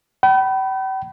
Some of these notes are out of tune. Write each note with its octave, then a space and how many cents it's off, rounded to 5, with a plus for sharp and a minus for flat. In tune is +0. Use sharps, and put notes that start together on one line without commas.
G5 -45 B5 +0